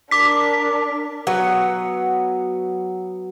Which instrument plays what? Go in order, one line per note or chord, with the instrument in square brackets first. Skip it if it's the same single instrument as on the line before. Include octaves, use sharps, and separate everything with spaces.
[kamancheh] D4 A#4 [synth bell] D6 B6
[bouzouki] F#3 B3 C#5